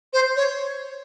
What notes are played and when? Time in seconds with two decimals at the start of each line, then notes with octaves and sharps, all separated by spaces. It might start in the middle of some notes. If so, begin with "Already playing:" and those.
0.13 C5
0.36 C#5